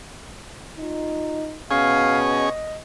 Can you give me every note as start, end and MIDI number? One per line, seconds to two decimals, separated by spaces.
0.78 1.61 63
0.78 1.54 65
1.71 2.45 47
1.71 2.49 61
1.71 2.49 68
1.71 2.18 77
2.30 2.77 75